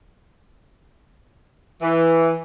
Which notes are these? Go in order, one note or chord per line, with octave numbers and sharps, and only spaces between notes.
E3